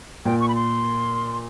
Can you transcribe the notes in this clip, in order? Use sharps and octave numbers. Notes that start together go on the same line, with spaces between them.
A#2 G5
C#6
B5
C6